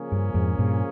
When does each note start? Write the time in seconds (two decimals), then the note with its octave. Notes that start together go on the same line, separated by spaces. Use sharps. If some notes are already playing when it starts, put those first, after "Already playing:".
Already playing: C#3 F3 A#3 C#4 G#4
0.12 G2
0.34 F2 G#2
0.58 G2 A#2